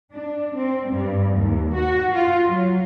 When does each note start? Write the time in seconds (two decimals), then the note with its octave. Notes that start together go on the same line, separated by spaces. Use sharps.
0.12 D4
0.57 C4
0.91 G2
1.37 D#2
1.74 F#4
2.15 F4
2.46 F#3